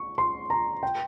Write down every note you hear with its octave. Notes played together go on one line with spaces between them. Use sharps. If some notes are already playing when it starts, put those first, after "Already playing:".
Already playing: C#6
C6
A#5
G5